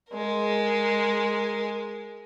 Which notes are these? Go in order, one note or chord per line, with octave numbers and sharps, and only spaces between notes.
G#3 A#4